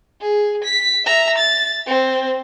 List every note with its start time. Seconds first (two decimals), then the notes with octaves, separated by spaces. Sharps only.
0.21 G#4
0.64 B6
1.05 E5 A#5
1.38 A6
1.87 C4